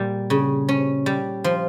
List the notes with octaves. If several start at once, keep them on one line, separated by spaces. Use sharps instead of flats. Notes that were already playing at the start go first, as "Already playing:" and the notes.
Already playing: A#2 G3
C#3
C#4
G3
F3